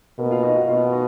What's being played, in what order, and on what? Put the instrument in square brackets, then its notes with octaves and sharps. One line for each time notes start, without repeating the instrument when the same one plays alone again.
[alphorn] B2 [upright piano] A#3 A#4
[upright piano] F4 F5
D#4 D#5
F#4 F#5
[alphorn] B2 [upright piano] F4 F5
[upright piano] D#4 D#5